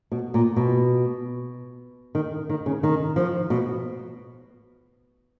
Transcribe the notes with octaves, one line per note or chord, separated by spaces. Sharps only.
B2
A#2
B2
D#3
D#3
C#3
D#3
F3
B2